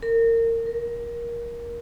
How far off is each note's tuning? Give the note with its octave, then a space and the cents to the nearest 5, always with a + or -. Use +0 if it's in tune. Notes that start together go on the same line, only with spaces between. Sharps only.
A#4 -30
A#4 +20